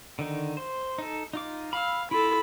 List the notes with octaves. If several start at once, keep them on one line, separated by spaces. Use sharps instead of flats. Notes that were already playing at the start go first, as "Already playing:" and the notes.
D3 D#3 D#4
C5
D#4 A4
D#4 F4 D6
F5 B5 E6
E4 F4 A4 B5